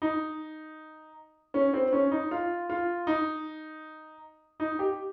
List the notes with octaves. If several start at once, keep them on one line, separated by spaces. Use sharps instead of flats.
D#4
C#4
C4
C#4
D#4
F4
F4
D#4
D#4
G4